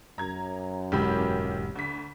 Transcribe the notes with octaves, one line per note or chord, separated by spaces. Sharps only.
F#2 A#5 G#6
E1 A1 G#2 G4 B5
D2 B6